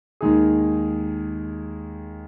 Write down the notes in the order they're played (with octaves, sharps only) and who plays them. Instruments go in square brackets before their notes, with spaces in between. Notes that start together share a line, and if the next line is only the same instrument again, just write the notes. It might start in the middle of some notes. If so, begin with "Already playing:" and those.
[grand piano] D#2 D#3 G#3 D#4 G#4